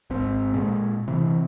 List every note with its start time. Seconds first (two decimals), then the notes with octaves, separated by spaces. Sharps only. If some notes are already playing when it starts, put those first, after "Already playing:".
0.10 G#1 C4
0.54 A#2 G#3
1.07 C3 E3